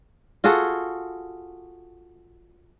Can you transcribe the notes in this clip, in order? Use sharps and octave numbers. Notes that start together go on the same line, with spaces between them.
F4 F#4 G#4 A4